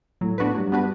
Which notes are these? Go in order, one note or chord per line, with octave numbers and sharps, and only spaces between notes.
A2 F#3
B3 D4 F#4 B4
G2 F#3
B3 D4 F#4 B4